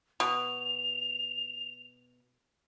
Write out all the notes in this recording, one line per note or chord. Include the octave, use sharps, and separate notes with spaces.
B2 F7